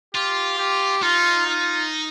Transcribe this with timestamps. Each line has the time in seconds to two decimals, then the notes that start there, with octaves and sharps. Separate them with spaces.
0.15 F4 G4
0.59 G4
1.02 D#4 F4
1.46 F4